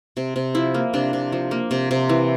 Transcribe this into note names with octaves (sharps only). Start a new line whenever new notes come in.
C3
C3
F3 E4
A#3
C3 D4
C3
F3
A#3
C3
C3
E3